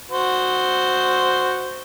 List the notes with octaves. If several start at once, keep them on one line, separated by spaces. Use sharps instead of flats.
F#4 C5